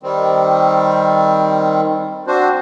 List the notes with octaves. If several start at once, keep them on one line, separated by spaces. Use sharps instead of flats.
D#3 G3 C4
C4 D4 F#4 C5